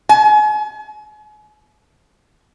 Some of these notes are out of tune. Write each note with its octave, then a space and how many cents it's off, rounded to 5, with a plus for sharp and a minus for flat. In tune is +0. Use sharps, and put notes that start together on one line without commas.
G#5 +40